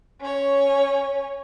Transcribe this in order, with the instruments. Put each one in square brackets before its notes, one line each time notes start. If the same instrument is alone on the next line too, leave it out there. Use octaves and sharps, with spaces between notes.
[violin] C#4 C#5